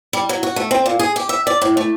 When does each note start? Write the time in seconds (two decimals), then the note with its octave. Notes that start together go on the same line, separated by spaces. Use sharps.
0.13 G3
0.29 F#3
0.43 F#4
0.56 A3
0.71 C4
0.86 A#2
0.99 G#4
1.16 G4
1.29 E5
1.47 D5
1.62 A2
1.77 A3